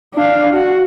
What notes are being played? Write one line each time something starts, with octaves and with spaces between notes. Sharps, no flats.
D4 F5
F#4